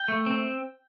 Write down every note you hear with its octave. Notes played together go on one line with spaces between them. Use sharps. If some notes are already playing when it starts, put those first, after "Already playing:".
Already playing: G5
A3
C4